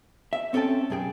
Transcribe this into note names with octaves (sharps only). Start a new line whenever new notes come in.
E5
C4 C#4 A4 E5 G5 A5
B1 F#2 G#4 G5